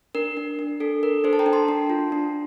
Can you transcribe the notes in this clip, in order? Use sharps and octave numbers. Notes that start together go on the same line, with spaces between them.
D4 A#4
D4
D4
D4 A4
A4 A#4
D4 A4 C5
A5
G5 A#5
D4
A5 C6
D4
F4
D4